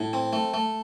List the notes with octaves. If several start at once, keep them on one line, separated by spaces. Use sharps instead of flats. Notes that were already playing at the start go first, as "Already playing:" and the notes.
Already playing: A2
C4
A3
A3